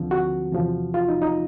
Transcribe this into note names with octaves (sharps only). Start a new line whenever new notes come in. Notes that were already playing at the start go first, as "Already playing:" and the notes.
Already playing: D2 D3 F3 C4
F#4
E2 C3 F3
F4
D#4
D#4